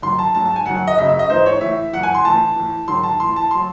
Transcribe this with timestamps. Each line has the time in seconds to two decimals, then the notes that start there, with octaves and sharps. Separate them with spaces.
0.02 F#2 D#3 F#3 C6
0.19 A5
0.35 G#2 F#3 A5
0.45 A5
0.56 G#5
0.66 F#2 D#3 F#3 F#5
0.87 D#5
0.98 F#2 C#3 F#3 E5
1.09 E5
1.19 D#5
1.30 G#2 E3 C5
1.46 C#5
1.61 A2 E3 E5
1.93 F#2 E3 F#5
2.03 G#5
2.15 C6
2.25 A2 E3 A5
2.56 A2 E3
2.88 G#2 D#3 F#3 C6
3.03 A5
3.20 A2 E3 C6
3.36 A5
3.51 C6
3.55 F#3